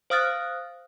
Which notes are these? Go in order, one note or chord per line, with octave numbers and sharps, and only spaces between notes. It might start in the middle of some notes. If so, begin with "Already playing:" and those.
C5 F5 D#6 F6 F#6 A6